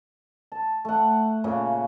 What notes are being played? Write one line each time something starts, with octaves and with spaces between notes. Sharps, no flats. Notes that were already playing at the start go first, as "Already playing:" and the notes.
A5
A3 F#5
A#2 C#3 C#5